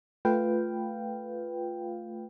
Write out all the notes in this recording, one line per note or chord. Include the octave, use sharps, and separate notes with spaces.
A3 F4 B4 F5 G5